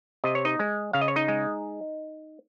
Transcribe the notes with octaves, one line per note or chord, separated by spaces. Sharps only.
C3 D#5
C#5
D#4 D#5
G#3
C#3 F5
D#5
C#5
D#4 D#5
G#3